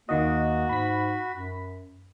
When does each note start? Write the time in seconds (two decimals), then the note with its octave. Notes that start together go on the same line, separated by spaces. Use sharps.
0.09 D#2 D#3 A#3 F#4 D#5
0.69 G#2 B5 B6
1.30 F#2